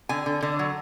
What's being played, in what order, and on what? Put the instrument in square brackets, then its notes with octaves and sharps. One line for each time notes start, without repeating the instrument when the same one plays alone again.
[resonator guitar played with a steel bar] D3 G#5
D3
D3
F#3